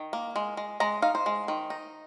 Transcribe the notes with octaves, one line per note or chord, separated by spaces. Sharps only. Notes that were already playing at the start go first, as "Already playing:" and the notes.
Already playing: D#3
A#3
G#3
G#3
G#3 A#5
D#4 F5
C5
G#3
D#3
D#4